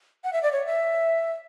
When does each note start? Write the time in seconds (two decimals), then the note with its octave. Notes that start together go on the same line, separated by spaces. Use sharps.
0.24 F#5
0.33 E5
0.43 D5
0.53 C#5
0.67 E5